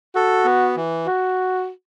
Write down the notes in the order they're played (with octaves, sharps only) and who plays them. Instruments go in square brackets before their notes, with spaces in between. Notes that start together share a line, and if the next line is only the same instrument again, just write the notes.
[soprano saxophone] F#4 [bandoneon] A4
[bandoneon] B3
E3
[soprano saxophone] F#4